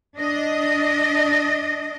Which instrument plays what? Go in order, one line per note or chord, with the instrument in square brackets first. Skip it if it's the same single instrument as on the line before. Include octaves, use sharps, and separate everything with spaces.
[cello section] D4 D#5